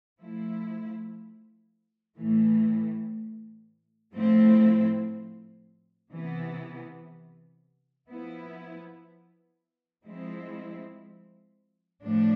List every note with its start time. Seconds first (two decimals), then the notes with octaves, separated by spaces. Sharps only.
0.20 F3 A3 E4
2.17 A2 E3 A3
4.15 A2 F3 A3 C4 E4
6.11 C3 E3 B3
8.09 F3 B3 E4
10.05 F3 G#3 C4 E4
12.03 A2 F3 A3 D4